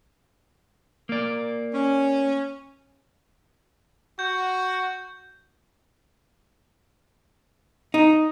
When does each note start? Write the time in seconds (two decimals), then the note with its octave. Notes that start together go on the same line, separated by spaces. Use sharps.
1.09 A#3 D5
1.73 C#4
4.19 F#4 G6
7.94 D#4